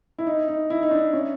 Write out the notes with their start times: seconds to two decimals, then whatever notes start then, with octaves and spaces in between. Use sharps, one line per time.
0.19 E4
0.27 D#4
0.48 D#4
0.70 E4
0.83 D#4
0.91 D4
1.13 C#4